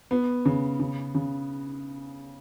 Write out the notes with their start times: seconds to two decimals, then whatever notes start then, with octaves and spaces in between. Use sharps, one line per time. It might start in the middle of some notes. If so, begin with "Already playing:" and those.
0.11 B3
0.45 C#3
0.80 C#3
1.15 C#3